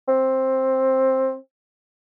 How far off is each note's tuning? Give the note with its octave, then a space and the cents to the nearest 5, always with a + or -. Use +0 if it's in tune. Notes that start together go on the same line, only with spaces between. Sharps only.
C4 +10